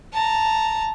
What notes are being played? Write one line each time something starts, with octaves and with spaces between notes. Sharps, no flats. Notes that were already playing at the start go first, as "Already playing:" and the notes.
A5 A#5